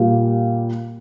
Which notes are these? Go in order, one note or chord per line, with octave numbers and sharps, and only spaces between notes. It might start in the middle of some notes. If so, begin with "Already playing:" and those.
Already playing: A#2 G3 A#3